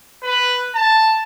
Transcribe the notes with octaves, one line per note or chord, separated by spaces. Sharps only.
B4
A5